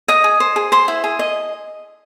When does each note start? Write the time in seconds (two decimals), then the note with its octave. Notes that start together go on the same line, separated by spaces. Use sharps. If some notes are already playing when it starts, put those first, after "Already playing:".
0.08 D#5 D#6
0.24 G#4
0.40 C5
0.56 G#4
0.72 C5 C6
0.88 E4
1.04 G#4
1.19 D#5